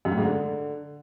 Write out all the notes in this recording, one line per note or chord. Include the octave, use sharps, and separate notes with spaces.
F#2
A2
G#2
D3